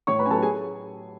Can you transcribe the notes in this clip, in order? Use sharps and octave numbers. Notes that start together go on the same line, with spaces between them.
A2 C#5 C#6
B4 B5
F#3 C#4 A4 G#5 A5
G#4 G#5